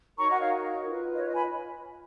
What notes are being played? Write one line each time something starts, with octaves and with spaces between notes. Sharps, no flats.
D#4 F#4 A#4 C#5 A#5 C#6
D#5 F#5
C#5 F5
F4 B4
D#5
C#5
D#5
G#5 B5